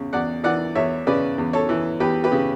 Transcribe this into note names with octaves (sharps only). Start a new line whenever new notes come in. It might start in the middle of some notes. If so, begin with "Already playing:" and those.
Already playing: E2 C#3
E2 D5 F#5
E3 D5 F#5
E2 C#5 E5
C#3 B4 D5
E2
A4 C#5
E3
E2 G4 B4
G4 B4
C#3